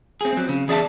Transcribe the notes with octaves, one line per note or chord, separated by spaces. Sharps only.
C4 G#4
F#3 C4
C#3
E2 G#4 D5 E5 A5